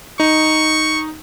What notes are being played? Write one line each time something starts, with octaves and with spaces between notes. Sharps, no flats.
D#4 C#6